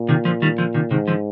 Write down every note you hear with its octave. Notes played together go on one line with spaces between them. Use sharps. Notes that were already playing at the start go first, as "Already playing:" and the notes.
Already playing: A#2
C3 D#3
D3 F3
D#3 G3
D3 F3
C3 D#3
G#2 C3 D#3
D3 F3